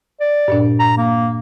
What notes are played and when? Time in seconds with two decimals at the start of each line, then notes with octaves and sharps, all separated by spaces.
0.20 D5
0.48 G2 A#2 D4
0.79 A#5
0.97 A#3